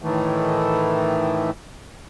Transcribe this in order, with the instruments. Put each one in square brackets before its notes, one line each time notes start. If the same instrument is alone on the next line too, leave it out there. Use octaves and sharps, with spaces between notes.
[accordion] A2 D#3 E3 A3